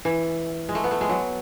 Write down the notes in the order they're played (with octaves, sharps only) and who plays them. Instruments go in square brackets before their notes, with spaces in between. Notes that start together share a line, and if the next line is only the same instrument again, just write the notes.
[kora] E3
G#3
A3
B3
A3
G#3
F#3